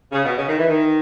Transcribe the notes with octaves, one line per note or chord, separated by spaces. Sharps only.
C#3
B2
C#3
D#3
E3
D#3